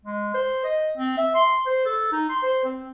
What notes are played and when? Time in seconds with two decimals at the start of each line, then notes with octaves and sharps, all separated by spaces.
0.05 G#3
0.34 C5
0.64 D#5
0.97 C4
1.18 E5
1.34 C6
1.66 C5
1.85 A4
2.12 D#4
2.29 C6
2.43 C5
2.64 C4